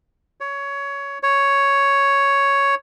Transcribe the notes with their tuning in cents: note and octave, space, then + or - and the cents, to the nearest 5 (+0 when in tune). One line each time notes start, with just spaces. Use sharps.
C#5 +15
C#5 +5